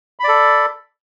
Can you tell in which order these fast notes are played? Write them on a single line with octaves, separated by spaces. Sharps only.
B5 D5 A4